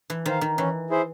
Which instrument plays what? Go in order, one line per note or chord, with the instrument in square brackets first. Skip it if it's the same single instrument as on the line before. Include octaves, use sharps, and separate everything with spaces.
[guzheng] E3
[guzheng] D#3 [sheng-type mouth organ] C5 F5
[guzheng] D#3
[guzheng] E3 [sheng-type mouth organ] C#4
[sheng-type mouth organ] E4 G#4 C5